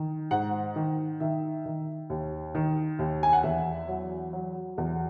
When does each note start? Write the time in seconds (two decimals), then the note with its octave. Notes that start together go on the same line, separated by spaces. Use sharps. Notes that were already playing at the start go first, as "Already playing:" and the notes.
Already playing: D#3
0.31 G#2 F#5
0.76 D#3
1.20 D#3 E5
1.65 D#3
2.10 D#2
2.55 D#3
2.99 D#2
3.23 G#5
3.33 F#5
3.43 E2 E5
3.88 F#3
4.33 F#3
4.78 E2